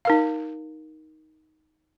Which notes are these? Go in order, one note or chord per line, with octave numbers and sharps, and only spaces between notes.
D#4 A#4 F5